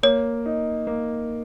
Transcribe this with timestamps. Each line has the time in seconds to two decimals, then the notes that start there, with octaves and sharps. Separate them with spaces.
0.03 A#3 C#5
0.46 D#4
0.87 A#3